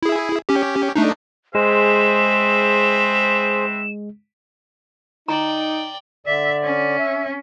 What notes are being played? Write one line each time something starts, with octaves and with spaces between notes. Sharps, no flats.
E4 G#4
C#4 G4
A3 D4 D#4
G#3 C4 G#4 B4 C5 E5 E7
D#4 D5 G5 A#5
D3 D5 E5
C#4
E5